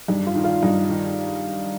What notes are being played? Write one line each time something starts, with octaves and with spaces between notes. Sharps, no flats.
G2 D#4
F4
D#3
F4
G2 D#4
D#3